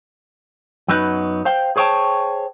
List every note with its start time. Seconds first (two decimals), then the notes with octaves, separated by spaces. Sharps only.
0.88 F#2 F#3 B3 D#4 B4
1.45 C5 F5 G5
1.76 G#4 C5 C#5 D#5 G5 A5